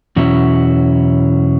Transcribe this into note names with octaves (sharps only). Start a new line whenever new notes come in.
E2 B2 F#3 C#4 E4